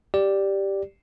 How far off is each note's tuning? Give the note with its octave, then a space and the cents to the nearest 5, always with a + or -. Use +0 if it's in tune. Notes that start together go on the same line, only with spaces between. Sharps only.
G4 +0 D5 +0